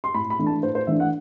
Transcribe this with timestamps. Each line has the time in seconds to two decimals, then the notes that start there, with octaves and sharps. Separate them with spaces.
0.04 C6
0.14 A2 B5
0.30 B5
0.39 E3 A3 D4
0.47 A5
0.63 A2 C5
0.75 C5
0.87 E3 A3 D4 E5
1.00 F#5